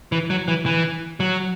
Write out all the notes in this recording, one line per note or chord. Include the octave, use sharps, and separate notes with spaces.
E3
F#3
E3
E3
F#3